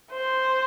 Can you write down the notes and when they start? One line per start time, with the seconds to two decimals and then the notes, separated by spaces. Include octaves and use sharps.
0.12 C5